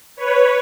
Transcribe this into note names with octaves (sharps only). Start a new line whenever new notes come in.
B4 C#5